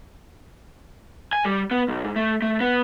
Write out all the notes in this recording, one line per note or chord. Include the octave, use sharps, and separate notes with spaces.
G#5
G3
B3
B1
G#2
A3
A3
B3